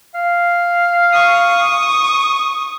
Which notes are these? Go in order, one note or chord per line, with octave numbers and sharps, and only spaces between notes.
F5
C#6 D#6